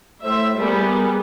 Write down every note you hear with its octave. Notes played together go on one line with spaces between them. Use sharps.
A2 C5 E5
G3 B3 G#4 A#4